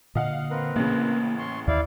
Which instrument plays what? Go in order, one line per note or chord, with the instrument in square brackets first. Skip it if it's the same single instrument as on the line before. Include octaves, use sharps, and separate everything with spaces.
[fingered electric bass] A#2 D3 [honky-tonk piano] D#5 F5 F#5
[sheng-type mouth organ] C4 A#4 B4
[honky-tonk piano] A1 C#3 [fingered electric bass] A#3
[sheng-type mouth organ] C6 C#6
[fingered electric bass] D#2 [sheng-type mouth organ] E4 D5 F5